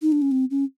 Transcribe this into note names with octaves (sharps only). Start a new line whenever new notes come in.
D#4
D4
C#4
C4
C#4